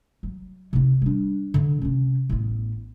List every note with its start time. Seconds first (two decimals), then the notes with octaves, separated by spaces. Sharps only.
0.23 F#3
0.73 C3 D#4
1.02 G3 D4
1.54 D3
1.81 C3 C#4
2.30 A1 B3